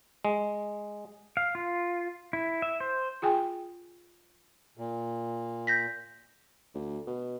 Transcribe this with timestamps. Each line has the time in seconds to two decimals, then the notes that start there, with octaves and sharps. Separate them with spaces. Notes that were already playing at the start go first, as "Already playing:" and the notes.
0.25 G#3
1.37 F5
1.55 F4
2.33 E4
2.62 E5
2.80 C5
3.22 F4 G#4 G5 G#5
4.77 A#2
5.67 G6 A#6 B6
6.75 D2
7.07 B2